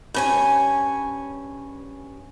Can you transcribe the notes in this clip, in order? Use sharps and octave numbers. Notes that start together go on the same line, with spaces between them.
G2 C#4 G#5